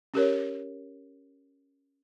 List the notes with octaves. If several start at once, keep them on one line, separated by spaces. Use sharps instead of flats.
C#4 G4 A#4 C#5